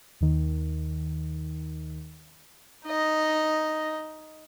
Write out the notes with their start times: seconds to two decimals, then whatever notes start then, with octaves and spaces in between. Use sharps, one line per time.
0.21 D#2 D#3
2.86 D#4 D#5